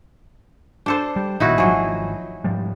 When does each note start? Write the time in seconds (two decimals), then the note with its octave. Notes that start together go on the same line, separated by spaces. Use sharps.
0.86 D4 A4 C5
1.16 G3
1.40 A1 A#2 D#3 D#4 E4 F#4
1.58 G#1 F3 F#3 G#4
2.44 G#2 F3 G3